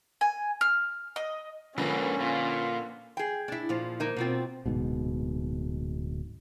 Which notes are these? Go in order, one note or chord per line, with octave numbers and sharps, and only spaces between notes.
G#5
F6
D#5
G#2 D3 F3 A#3 C#4 B4
A#2 F4
G#4 G5
D4 E4
A#2 F3
A#3 D#4
B2 C4 F4
D1 G#2 B2